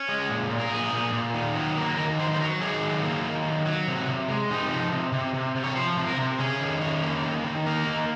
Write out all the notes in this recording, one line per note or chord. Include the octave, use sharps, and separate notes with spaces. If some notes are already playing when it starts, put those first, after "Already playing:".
Already playing: C#4
G#3
A#2
A#2
A#4
A#2 G#4
A#2
A#2
D#3
F#3
A#3
D#3 A#4
F#3 C5
C5
F#3 A#4
D#3 G#4
F#3
A#3
D#3
F#3
F#3
C3
C3
G#3
C3 D#4
F3
C3
C3
C3
C3
C#5
F3 C5
C3
A#4
C3
C#4 G#4
D#3
C#4
A#3
D#3
D#3
A#3 A#4
D#3